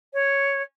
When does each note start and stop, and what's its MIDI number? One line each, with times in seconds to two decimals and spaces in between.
0.14 0.62 73